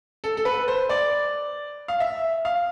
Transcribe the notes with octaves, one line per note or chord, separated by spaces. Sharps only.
A4
A4
B4
C5
D5
F5
E5
F5